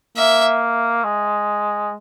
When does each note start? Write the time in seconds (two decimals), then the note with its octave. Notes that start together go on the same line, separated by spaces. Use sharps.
0.17 A#3 E5
1.04 G#3